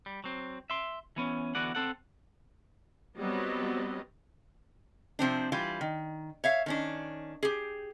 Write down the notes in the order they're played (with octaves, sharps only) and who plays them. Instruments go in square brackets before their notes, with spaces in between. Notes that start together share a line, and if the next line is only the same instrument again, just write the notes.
[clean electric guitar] G3
F#3 C4
E5 C6
E3 B3 C#4
D3 E3 B3 F#4 D5 F#5
C4 A4 F#5
[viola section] F#3 G3 B3 C4 B4 D#5
[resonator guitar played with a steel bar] C3 F3 C4 D4
E3 G3 F4
D#3
C#5 E5 F5
D#3 C#4 D4
G4 G#4